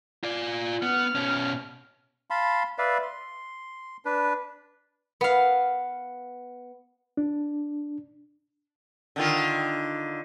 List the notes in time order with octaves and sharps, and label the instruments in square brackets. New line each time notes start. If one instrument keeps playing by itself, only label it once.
[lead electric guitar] F4 D5
[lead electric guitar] B3 [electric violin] F6
[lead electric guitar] B2 C#4
[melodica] F5 A5 B5 C6
B4 D5 E5 F5
C6
D4 B4
[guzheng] B3 F5
[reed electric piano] D4
[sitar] D3 D#3 F4